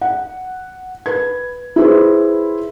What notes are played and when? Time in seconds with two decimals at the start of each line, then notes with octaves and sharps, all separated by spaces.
0.01 F#5
1.06 B4 G#6
1.76 E4 G#4 B4 C5